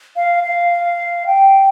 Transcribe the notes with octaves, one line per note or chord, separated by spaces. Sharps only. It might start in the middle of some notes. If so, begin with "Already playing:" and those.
F5
F5
G5